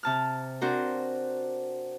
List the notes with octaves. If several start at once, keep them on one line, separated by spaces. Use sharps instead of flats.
C3 A5 F6
C4 D4 F#4 A#4 C5